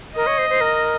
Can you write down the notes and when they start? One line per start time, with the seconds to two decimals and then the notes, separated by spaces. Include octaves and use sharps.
0.16 A#4 D#5
0.27 C#5
0.38 C5
0.50 C5
0.61 A#4